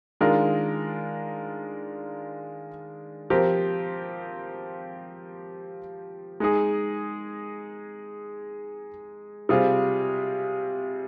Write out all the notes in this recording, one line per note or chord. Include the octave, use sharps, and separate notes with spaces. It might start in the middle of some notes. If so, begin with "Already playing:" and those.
D#3 G#3 D4 F4 A#4
F3 C4 G4 A#4
G#3 D#4 G#4
C3 G3 C4 F4 G#4